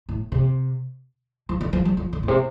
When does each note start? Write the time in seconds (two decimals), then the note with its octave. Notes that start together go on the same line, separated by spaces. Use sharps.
0.09 A2
0.32 C3
1.49 F3
1.61 D3
1.73 F3
1.85 G3
1.97 F3
2.13 D3
2.23 A2
2.28 C3